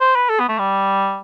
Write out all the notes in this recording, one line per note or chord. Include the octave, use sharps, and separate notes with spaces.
C5
B4
A4
B3
A3
G3